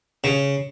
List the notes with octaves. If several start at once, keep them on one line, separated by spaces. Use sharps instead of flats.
C#3